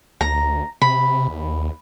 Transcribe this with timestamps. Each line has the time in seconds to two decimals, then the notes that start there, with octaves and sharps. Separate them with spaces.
0.21 D2 A#5
0.82 C3 B5
1.28 D#2